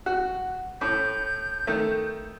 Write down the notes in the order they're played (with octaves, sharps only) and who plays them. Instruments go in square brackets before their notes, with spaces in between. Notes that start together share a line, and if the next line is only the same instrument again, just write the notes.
[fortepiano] F#4
[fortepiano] A2 [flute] G6
[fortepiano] D#3 A3